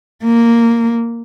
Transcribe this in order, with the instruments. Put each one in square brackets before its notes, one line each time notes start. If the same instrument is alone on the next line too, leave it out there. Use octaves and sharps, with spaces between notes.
[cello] A#3